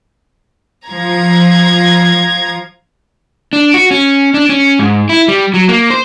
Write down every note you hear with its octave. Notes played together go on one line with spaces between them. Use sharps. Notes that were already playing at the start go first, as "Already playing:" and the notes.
F3 A#5 G#6
D4
F#4
C#4
D4
C#4
G#2
E4
G3
F#3
A#3
C5